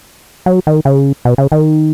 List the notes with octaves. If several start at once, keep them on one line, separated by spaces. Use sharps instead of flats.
F#3
D#3
C#3
B2
C#3
D#3